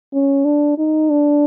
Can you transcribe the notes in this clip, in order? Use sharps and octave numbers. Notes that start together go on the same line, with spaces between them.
C#4
D4
D#4
D4